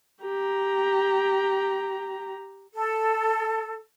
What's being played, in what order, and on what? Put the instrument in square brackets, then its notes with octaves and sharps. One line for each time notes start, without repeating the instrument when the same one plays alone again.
[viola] G4 A#5
[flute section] A4